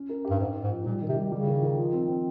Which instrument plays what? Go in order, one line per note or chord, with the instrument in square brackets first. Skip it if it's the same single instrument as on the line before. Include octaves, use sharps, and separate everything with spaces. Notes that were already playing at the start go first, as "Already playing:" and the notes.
Already playing: [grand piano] C#4
A#4
G4
[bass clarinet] G2
[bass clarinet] G#2 [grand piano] D#4
[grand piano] D#4
[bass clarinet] G#2
[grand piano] F3
[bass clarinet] A#2 [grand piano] G3
[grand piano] D#3
[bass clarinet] C3
[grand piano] G3
[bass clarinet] C#3 [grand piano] G3
[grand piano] D#3
D#3
F3
C4
C4